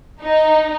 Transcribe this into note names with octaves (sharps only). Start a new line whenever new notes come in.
D#4